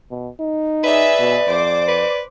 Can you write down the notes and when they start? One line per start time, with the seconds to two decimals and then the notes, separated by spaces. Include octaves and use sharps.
0.11 B2
0.40 D#4
0.84 G#4 B4 D5 E5
1.19 B2
1.48 F2 C5 D6
1.88 B4